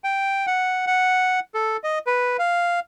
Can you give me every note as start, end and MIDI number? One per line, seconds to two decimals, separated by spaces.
0.04 0.46 79
0.47 0.86 78
0.87 1.40 78
1.54 1.77 69
1.84 1.99 75
2.07 2.37 71
2.39 2.80 77